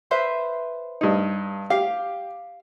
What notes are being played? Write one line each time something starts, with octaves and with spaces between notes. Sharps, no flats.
B4 C5 E5
G2 D#4
G4 F5